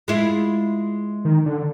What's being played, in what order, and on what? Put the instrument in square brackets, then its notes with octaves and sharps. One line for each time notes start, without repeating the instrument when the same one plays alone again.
[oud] G#3 E4 F4
[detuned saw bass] D#3
D3